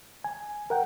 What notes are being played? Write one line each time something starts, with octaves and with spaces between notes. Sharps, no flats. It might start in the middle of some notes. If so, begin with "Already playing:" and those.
G#5
A#4 F#5 G5